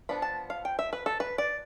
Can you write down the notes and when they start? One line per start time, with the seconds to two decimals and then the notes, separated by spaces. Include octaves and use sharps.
0.09 F3 B3 D4 B5
0.22 A5
0.50 F5
0.65 G5
0.79 E5
0.93 B4
1.06 A4
1.20 B4
1.38 D5